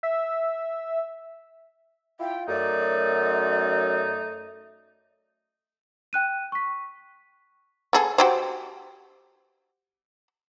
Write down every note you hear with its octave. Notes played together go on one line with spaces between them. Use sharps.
E5
E4 F4 G5
F#2 A3 D#4 D5
G5 F#6 D#7
C#6 B6
B3 G#4 A4
F#4 G4 C5